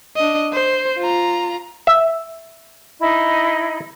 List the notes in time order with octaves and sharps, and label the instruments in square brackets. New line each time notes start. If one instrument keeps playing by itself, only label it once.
[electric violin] D4 D#5
C5
F4 A#5
[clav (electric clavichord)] E5
[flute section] D#4 E4 D#5